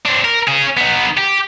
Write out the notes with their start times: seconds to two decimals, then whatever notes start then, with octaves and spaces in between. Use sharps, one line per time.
0.05 C4 D4
0.25 A#4
0.48 C#4 G#4
0.77 B3 D#4
1.17 G4